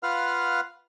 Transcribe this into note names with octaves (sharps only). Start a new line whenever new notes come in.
F4 B4 F5 F#5 F6